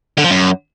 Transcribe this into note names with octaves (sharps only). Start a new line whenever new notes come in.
D3
F3
F#2